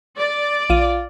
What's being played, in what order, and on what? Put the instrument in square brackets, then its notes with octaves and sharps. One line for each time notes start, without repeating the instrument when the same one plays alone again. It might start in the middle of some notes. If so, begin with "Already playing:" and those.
[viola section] D5
[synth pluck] A#1 D#7 [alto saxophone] F4